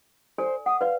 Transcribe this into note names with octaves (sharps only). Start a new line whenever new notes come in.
A4 C5 D5 G#5
F#5 D#6
B4 D5 F5